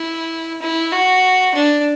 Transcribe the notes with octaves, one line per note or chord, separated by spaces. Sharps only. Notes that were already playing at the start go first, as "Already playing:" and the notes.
Already playing: E4
E4
F#4
D4